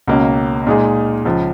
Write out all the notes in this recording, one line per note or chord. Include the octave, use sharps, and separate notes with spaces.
C#2 B2 A#3 C#4
A#2 G#3 D#4 G#4
C#2 C#3 F3